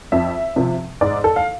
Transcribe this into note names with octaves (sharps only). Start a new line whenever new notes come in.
F2 E5
C3 F3
G#2 D5
A4
F5